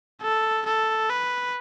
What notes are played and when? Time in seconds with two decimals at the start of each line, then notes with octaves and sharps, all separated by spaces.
0.22 A4
0.66 A4
1.10 B4